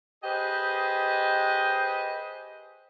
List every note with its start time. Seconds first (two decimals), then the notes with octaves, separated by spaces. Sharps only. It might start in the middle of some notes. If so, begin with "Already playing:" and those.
0.23 G4 G#4 B4 C5 D#5